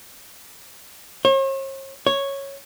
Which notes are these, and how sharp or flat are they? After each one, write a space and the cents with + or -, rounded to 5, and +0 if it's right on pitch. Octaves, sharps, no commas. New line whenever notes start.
C#5 -45
C#5 -5